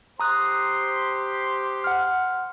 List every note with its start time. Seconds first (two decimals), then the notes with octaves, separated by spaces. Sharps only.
0.20 G4 C5 A#5 C6 D#6 F#6
1.84 F#5 F6